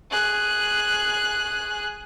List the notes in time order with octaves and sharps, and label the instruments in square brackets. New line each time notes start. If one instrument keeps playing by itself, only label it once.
[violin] G#4 F#6